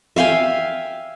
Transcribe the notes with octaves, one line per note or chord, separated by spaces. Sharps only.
E5 F5 G5 G#5